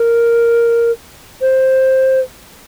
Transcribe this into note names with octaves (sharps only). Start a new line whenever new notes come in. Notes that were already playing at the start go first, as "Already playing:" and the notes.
Already playing: A#4
C5